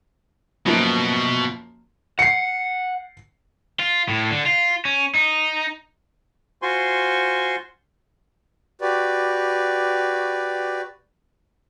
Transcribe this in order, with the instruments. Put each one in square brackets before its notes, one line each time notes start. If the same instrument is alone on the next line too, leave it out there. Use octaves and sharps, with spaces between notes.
[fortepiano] F#2 F3 A#3 [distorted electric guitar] B2
[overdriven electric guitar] F#5 [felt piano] C7 C#7
[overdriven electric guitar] F4
A2
D3
F4
C#4
D#4
[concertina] F4 F#4 C5 G#5 C6 C#6
[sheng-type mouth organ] F#4 G4 B4 D5